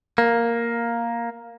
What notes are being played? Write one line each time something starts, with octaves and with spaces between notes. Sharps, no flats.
A#3